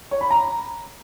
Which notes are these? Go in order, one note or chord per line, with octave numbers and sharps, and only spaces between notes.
C#5
B5
A#5